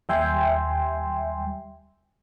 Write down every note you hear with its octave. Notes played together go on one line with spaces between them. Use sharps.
D#2 G3 E5 G5 G#5 C6